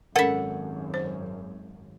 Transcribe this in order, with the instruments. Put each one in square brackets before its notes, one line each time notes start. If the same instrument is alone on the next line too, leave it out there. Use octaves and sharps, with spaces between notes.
[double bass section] G#1 F#2 [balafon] C#4 A#4 [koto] A4 E5 [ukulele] F#5
[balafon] C5